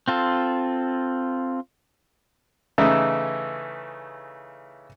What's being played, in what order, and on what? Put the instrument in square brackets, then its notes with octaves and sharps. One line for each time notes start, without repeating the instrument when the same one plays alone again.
[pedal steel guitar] C4 F4 A4
[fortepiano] C#3 E3 A3 D#4 E4